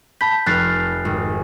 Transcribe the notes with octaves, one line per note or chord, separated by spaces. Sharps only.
A5 B5 G6 B6
F1 F6 F#6 A6 C7
G#1